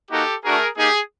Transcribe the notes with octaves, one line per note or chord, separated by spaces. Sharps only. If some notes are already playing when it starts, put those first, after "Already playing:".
A#3 D#4 F#4 G4 A4
A3 D4 F#4 G#4 A#4
A#3 D#4 G4 G#4